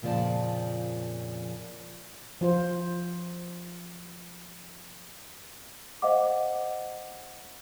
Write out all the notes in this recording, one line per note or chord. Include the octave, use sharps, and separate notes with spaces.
F2 A#2 C#3 F3 D5 A5
F3 F4 C5
C5 D#5 F5 F#5 D6